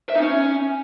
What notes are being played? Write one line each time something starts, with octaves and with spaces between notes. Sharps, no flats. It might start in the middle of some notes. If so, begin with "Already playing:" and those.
E5
D#4
C#4